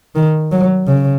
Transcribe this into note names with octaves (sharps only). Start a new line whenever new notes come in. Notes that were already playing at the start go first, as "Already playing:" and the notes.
D#3
F#3
C#3